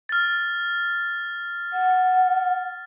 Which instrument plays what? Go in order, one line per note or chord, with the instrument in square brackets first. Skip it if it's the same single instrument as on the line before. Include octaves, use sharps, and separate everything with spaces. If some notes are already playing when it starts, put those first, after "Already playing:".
[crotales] F6 A6
[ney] F#5